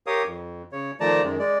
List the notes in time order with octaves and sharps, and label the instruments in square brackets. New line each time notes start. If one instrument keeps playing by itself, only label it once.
[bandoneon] G4 A#4 C#5 F5 D#6
F2
C#3 C#5
D#3 F3 A3 D5 A5 A#5
F#2 D#3 G#3
G#3 D5